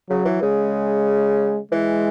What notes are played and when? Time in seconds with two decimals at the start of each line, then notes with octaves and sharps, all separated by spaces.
0.10 C#3 F#3
0.25 E3
0.42 C#3 G#3
1.71 E3 G#3